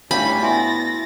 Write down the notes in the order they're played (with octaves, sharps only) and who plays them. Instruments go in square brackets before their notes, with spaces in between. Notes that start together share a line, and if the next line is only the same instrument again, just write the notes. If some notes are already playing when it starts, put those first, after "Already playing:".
[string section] A2 G3 C#4 [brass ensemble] D4 [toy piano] C#5 E5 F5 [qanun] B5
[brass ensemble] B3 E4 [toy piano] F#4 E5 G#5 [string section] A6 A#6